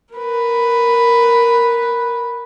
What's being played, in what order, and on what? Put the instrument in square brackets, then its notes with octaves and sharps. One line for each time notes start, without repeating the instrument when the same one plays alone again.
[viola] A#4 B4